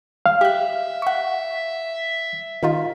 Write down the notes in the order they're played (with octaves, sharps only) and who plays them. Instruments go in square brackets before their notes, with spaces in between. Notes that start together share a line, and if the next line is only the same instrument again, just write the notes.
[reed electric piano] F5
[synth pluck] G4 F#6 [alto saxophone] E5
[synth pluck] F#5 C#6
D#3 D#4 F4